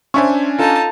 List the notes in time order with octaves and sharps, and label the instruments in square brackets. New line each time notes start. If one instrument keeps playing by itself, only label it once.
[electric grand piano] C#4 D4 G#5 [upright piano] C5 E5 C#6
[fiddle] D#4 A5 [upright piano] F4 A4